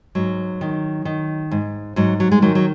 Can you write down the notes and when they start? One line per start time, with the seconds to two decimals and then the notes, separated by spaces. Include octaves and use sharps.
0.15 G#2 F#3
0.61 D#3
1.05 D#3
1.51 G#2
1.96 G#2 F#3
2.20 F#3
2.31 G#3
2.42 D#3 F#3
2.55 F#3